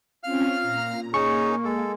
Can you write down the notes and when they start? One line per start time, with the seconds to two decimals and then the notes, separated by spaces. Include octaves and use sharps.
0.23 C4 C#4 F4 F5 F6
0.61 A#2 A#5
1.14 A#3 C#4 D#4 G#4 C#6
1.65 G#3 A4